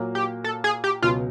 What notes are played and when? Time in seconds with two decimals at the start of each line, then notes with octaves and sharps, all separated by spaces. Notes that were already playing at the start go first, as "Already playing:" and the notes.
Already playing: A#2 F#3 A#3
0.15 G4
0.44 A4
0.64 G#4
0.84 G4
1.02 C#2 B2 F#3 F4